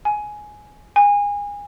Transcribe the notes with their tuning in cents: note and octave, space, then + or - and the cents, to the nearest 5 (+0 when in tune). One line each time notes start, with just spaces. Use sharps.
G#5 +10
G#5 -25